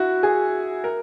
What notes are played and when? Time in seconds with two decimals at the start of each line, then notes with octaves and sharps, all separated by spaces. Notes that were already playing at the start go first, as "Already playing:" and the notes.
Already playing: E4 F#4
0.23 G#4
0.84 A#4